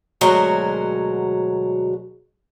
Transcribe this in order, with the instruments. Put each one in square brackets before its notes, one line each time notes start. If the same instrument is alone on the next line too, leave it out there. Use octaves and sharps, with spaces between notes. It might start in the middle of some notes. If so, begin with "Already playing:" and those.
[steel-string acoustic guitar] D2 B2 F#3 G#3 F#4 A#4